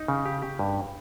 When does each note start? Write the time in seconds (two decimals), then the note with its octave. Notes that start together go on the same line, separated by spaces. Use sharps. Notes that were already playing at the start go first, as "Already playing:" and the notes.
Already playing: D#4
0.08 C#3
0.25 G4
0.42 G4
0.59 G2